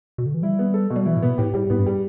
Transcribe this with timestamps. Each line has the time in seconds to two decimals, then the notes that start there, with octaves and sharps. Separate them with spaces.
0.18 B2
0.26 D3
0.34 E3
0.42 G3 E4
0.59 B3
0.74 A4
0.90 B2
0.96 G3
1.06 E3 E4
1.17 A2
1.22 B2 B3
1.38 A2 G4
1.54 A2 G3
1.70 A2 B3
1.79 G2
1.86 G3